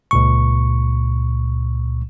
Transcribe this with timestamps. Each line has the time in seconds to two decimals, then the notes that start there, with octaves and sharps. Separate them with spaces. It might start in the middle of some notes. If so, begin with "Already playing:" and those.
0.11 C#2 A#2 C#6